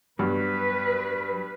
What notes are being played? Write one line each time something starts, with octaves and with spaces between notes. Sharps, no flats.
G2 F#3 B3 B4